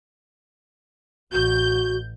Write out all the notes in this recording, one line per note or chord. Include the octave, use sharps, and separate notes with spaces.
A1 F#4 G6